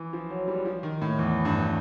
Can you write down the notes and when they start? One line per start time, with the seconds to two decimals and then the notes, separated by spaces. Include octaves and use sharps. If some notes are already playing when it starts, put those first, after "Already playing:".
Already playing: E3
0.13 F3
0.31 F#3
0.48 G3
0.65 F3
0.83 D#3
1.02 A2
1.19 E2
1.45 G2